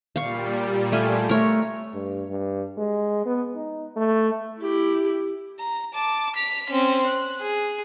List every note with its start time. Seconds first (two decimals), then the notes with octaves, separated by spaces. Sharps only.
0.16 A#2 G3 F5 C#6
0.92 A3 F4 G#5
1.29 A3 A#4 C#5
1.94 G2
2.29 G2
2.77 G#3
3.26 B3
3.55 D#4
3.96 A3
4.60 E4 G4
5.59 A#5
5.95 A5 D6
6.36 B6 F7
6.70 C4 C#4
7.06 F#6
7.41 G#4